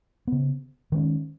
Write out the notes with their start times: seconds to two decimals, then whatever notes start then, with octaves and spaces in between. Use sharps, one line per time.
0.27 C#3 B3
0.92 D#3 G#3 C#4